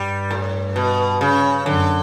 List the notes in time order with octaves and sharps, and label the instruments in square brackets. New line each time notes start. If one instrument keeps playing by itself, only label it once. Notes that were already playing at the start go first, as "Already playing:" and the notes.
Already playing: [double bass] G2 [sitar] G3
[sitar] A2
B2
C#3
[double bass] F#2 [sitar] D3